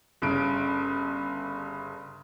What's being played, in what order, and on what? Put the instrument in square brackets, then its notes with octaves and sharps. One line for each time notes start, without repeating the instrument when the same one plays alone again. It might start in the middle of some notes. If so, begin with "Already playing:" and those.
[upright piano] G1 C#3 D7